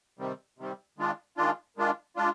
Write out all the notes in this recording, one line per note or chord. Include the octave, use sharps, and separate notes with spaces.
C3 D#3 G3 C4
C3 D#3 G3 C4
D#3 G#3 D4 F4
D#3 G#3 D4 F4
D#3 G#3 D4 F4
G#3 D4 F4